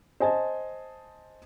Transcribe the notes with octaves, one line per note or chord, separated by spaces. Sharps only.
C5 D#5 G#5 A5